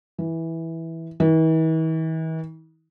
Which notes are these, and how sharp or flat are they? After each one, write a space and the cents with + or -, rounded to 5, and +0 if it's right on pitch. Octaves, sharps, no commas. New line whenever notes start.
E3 -10
E3 -45